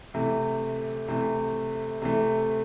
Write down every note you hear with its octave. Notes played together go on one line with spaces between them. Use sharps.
C3 E3 A3
C3 E3 A3
C3 E3 A3